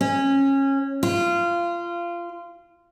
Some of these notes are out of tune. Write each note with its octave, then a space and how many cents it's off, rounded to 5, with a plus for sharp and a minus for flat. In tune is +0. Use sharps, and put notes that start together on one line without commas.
C#4 -20
F4 -20